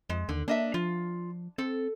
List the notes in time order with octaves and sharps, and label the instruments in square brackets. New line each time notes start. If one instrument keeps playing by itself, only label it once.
[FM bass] F2 [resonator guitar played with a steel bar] G#3
[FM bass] D#2 [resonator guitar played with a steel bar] D3
[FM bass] A#3 [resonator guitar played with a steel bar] D4 D#5 E5
[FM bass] F3 [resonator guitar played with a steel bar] F4
[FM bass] C4 [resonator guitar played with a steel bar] A4